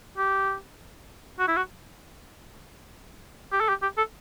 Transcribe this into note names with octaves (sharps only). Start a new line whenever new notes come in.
G4
F#4
E4
F#4
G4
A4
G4
G4
A4